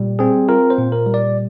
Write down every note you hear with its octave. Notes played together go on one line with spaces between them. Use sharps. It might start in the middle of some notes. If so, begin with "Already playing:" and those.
Already playing: A#2 G3
C4 G#4
F4 A#4
C5
A#2
A#4
G3
D5